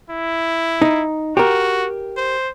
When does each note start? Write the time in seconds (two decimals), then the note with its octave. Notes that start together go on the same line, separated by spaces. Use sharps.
0.10 E4
0.82 D#4
1.37 F#4 G4 A#4
2.17 C5